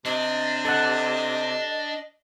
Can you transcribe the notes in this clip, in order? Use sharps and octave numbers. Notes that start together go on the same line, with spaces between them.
C3 D4 D#5
A4 D#5 F#5